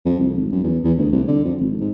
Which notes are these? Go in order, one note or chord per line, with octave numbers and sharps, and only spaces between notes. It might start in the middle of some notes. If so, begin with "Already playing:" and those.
F2
C2
G#1
F#2
E2
E2
D2
C2
D3
F2
G#1
G#2